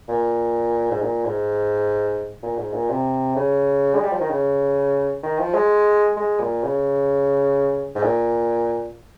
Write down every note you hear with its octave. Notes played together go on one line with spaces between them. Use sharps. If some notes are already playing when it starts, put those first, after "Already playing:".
A#2
G#2
A#2
G#2
A#2
G#2
A#2
C3
C#3
G#3
G3
F3
D#3
C#3
D#3
F3
G#3
G#3
A#2
C#3
G#2
A#2